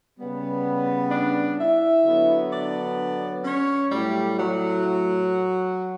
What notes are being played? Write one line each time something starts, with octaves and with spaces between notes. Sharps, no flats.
C#3 G3 B3
D4 D5
E4 E5
D3 F#3 B3
D4 D5
C#4 C#5
A2 F#3 G3 A3 G4
F#3 F#4